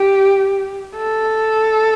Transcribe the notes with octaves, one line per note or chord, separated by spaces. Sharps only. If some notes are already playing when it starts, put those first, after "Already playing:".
Already playing: G4
A4